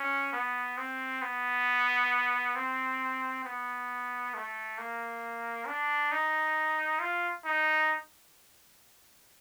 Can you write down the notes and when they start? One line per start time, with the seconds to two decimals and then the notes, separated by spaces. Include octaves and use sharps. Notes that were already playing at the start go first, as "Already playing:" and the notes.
Already playing: C#4
0.33 B3
0.77 C4
1.22 B3
2.56 C4
3.44 B3
4.34 A3
4.78 A#3
5.67 D4
6.12 D#4
7.00 F4
7.45 D#4